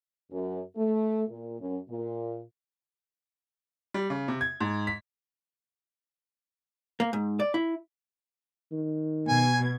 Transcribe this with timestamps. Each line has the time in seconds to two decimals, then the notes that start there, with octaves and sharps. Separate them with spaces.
0.31 F#2
0.76 A3
1.29 A#2
1.60 F#2
1.89 A#2
3.94 G3
4.10 C#3
4.28 C3
4.41 G#6
4.61 G#2
4.87 B6
7.00 A#3
7.13 G#2
7.40 D5
7.54 E4
8.72 D#3
9.29 B2 G#5 G#6